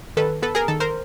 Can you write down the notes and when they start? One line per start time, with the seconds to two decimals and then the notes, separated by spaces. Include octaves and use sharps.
0.17 D#3 A4 B4
0.42 B3 A4 B4
0.55 G#4 A#4
0.68 D#3 A4
0.80 A#4 C5